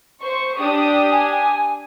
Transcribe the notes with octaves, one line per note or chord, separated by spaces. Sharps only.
C5 C#6
D4 G4 D#6
G#5